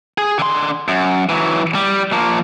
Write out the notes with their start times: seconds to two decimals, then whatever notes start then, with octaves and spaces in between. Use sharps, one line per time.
0.18 G#4
0.39 D3 C6
0.88 F#2
1.29 E3 F#3
1.75 G3
2.12 F3 A#3